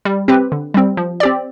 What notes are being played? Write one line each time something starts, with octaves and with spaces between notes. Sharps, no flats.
G3
C4 G4 B4
D3
G3 C4
F3
C4 G4 D5